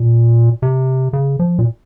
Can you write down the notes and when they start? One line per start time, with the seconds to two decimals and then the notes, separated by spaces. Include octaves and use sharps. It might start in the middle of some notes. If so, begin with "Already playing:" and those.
Already playing: A#2
0.62 C3
1.13 C#3
1.39 F3
1.58 A#2